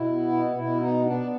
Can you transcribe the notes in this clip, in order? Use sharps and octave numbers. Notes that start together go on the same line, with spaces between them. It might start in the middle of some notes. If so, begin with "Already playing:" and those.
Already playing: B2 E4
B3
B2
B2 E4
B3 D#4
B3 D4